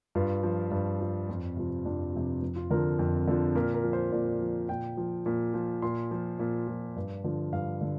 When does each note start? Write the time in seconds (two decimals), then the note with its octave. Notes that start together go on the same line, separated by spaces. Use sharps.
0.15 G2 F4
0.43 F3
0.71 G2
1.00 F3
1.29 F2
1.57 C3 F3
1.85 F2 D4
2.13 C3 F3
2.42 F2
2.56 F4
2.70 D3 F3 A#4
2.99 F2
3.27 D3 F3
3.55 A#2 A#4
3.74 A#4
3.84 F3
3.93 C5
4.12 A#2 D5
4.40 F3
4.69 A#2 G5
4.97 F3
5.26 A#2
5.54 F3
5.82 A#2 C6
6.11 F3
6.39 A#2
6.68 F3
6.96 G2
7.24 D3 F3
7.53 G2 F5
7.81 D3